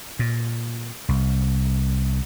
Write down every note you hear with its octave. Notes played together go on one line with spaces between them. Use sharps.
A#2
C2